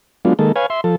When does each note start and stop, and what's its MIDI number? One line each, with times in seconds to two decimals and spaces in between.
0.25 0.33 54
0.25 0.33 56
0.25 0.33 59
0.25 0.33 62
0.25 0.33 65
0.39 0.52 51
0.39 0.52 56
0.39 0.52 58
0.39 0.52 69
0.56 0.66 71
0.56 0.66 73
0.56 0.66 77
0.56 0.66 80
0.70 0.81 76
0.70 0.81 84
0.84 0.96 53
0.84 0.96 69